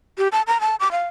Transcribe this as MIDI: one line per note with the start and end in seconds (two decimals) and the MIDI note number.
0.18 0.28 67
0.32 0.42 81
0.47 0.60 82
0.61 0.76 81
0.80 0.88 86
0.92 1.08 77